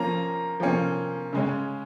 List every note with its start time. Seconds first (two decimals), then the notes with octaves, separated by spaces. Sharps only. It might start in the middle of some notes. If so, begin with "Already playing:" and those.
Already playing: F3 A#3 C#4 A#5
0.60 F3 A#3 C#4
1.33 C#3 G#3 C#4